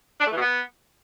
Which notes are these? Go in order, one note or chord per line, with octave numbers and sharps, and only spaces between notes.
D4
A3
E3
B2
B3